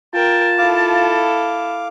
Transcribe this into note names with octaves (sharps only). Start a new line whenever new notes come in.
F4 A#4 G5 A5
E4 A4 F5 D6